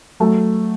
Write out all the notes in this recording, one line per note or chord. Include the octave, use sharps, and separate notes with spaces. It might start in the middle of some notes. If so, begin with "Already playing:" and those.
F#3 A3